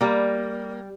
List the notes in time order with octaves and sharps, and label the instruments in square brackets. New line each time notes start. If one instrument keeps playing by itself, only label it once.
[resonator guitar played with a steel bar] G3 A#3